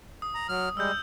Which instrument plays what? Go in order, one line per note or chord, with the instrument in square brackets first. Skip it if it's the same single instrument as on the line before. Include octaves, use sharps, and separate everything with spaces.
[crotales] D#6
[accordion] A#5
F#3 F6
[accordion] G3 G#3 [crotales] E6 G6